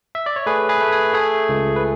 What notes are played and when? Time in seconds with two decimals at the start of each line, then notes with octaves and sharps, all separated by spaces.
0.15 E5
0.26 D5
0.36 C#5
0.46 A3 G#4 B4
0.69 G#4 B4
0.81 A3
0.92 G#4
1.14 A3 G#4
1.49 C#2
1.76 B4